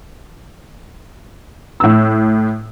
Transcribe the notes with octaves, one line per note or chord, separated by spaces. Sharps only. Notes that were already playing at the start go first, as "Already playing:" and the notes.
A2 E6